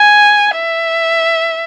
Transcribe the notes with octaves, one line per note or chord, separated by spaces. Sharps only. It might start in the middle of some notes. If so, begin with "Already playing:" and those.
Already playing: G#5
E5